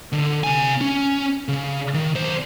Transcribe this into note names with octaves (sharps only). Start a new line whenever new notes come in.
D3
C3 G#5
C#4
C#3
D#3
B1 C5